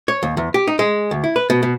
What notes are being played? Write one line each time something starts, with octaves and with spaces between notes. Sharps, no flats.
C#5
D#2
E2
G4
D#4
G#3
D2
E4
B4
B2
B2